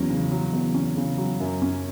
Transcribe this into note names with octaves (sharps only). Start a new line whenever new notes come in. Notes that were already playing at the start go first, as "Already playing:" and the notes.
Already playing: E2 F#3 C#4
C#3
F#3
E2
C#4
C#3
F#3
F#2
C#4